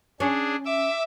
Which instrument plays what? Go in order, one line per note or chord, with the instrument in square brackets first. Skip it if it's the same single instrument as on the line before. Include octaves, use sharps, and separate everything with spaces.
[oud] C#4 [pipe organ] D4 G#4
[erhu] E5 [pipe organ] D6 E6